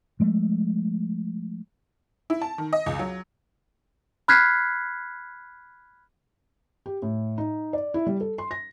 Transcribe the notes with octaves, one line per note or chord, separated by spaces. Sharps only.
F3 G#3 A3
E4
A5
D#3
D#5
C#2
F#3
B5 F6 F#6 G#6 B6 C7
G4
A2
D#4
D5
E4
G3
A4
C6
A#6